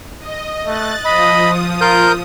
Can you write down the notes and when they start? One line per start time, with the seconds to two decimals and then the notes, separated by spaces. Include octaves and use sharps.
0.19 D#5
0.66 A3 F#6 A6
1.05 F3 D#5 B5 D#6
1.81 F4 A#4 G6